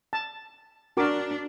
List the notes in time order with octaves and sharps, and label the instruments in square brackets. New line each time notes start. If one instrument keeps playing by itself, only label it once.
[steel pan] A5
[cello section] D4 [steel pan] F#4 A#4 D6